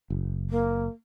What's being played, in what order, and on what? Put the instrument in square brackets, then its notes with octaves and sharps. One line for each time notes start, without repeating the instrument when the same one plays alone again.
[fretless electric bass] F#1
[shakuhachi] A#3